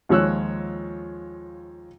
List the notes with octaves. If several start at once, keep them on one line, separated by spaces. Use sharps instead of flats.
D#2 F3 G#3 C#5 E6 F#6